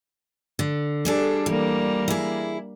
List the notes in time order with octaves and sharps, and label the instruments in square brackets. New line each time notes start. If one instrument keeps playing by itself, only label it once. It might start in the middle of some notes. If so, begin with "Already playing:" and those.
[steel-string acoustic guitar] D3
[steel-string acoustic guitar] G3 G#4 A4 [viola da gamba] D4
[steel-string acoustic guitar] E3 [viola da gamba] G3 A#3
[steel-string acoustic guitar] E4 G#4